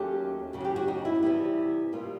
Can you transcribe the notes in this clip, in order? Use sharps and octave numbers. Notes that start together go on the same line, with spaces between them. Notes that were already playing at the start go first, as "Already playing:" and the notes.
Already playing: D#2 D#3 F#3 A3 C#4 G4
F#2 C#3 F#3
F#4
G4
F#4
D#4
E4
C3 E3 G3 B3 E4
B2 G3 A#3 F4